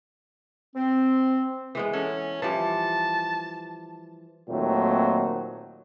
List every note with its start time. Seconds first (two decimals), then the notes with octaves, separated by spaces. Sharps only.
0.75 C4
1.75 E3 G#3 B3
1.93 C#4 A4
2.42 E3 F3 G3 A5
4.49 D#2 A#2 F#3 A3 C4